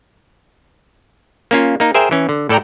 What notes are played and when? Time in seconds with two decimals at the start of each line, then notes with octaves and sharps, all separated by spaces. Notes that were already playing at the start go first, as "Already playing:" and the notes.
1.51 A#3 C#4 F4
1.80 A#3 D#4
1.94 G#4 A#4 C5 E5 G5 G#5
2.11 E3 C#4
2.29 D3
2.49 A2 A4 D5 G5 A#5